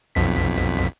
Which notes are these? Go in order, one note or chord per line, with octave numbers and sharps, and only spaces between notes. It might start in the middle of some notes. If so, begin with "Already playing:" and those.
B1 F2 B6